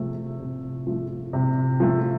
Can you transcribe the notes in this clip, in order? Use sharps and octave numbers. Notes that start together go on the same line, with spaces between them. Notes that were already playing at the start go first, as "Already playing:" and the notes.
Already playing: C3 F3 A3
C3
F3 A3
C3
F3 A3